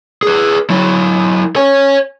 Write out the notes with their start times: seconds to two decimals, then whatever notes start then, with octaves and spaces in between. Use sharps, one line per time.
0.23 G#4 B4
0.70 F#3 E4
1.56 C#5 G#5